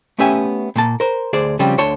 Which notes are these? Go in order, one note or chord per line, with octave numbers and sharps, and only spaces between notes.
A3 B3 C#4 G4 E5 G#5
A#2 A#3 A5
A#4 C5
D2 G#4 C5 D5
C#3 F3 G3 C4 F4
D2 D3 C#5 A5 C6